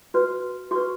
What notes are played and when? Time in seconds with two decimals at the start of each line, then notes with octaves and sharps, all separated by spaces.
0.14 F#4 B4
0.71 F#4 C#6
0.76 B4